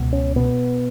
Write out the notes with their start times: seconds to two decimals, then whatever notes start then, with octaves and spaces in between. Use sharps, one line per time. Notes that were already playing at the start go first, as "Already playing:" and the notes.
Already playing: C#2 B2
0.13 C#4
0.36 B2 B3